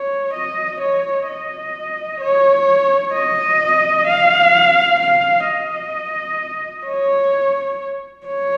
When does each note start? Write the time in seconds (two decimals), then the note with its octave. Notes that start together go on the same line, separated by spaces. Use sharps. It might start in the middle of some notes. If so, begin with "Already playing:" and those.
Already playing: C#5
0.34 D#5
0.81 C#5
1.27 D#5
2.21 C#5
3.14 D#5
4.07 F5
5.00 F5
5.47 D#5
6.87 C#5
8.27 C#5